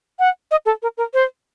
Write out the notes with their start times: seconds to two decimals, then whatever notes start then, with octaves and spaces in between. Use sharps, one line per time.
0.19 F#5
0.51 D#5
0.66 A4
0.82 A#4
0.97 A#4
1.14 C5